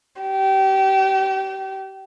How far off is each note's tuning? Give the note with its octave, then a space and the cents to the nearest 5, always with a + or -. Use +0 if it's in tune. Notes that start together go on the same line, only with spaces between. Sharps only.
G4 -30